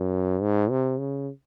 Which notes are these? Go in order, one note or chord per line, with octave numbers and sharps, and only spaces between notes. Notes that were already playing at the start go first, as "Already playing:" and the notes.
Already playing: F#2
G#2
C3
C#3